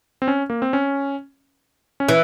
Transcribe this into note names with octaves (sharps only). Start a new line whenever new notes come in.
C4
C#4
A#3
C4
C#4
C#4
E3